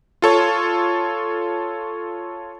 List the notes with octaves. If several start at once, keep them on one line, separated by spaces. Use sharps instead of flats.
F4 A4 C#5